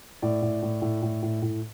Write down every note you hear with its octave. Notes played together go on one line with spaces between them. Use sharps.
A2 D5
A2
A2
A2
A2
A2
A2